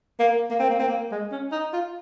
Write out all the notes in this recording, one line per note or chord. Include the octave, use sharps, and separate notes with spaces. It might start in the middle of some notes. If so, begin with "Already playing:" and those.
A#3
A#3
C4
A#3
C4
A#3
G#3
C#4
D#4
F4